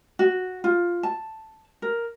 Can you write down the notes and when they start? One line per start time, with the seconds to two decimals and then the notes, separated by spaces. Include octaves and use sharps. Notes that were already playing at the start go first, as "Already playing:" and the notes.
0.19 F#4
0.64 F4
1.03 A5
1.82 A#4